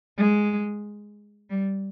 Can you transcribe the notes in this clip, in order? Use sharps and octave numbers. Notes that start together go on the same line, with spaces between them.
G#3
G3